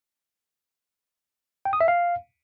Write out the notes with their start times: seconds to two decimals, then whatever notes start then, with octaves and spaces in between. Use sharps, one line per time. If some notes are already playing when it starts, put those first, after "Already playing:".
1.65 G5
1.73 D#6
1.81 E5
1.88 F5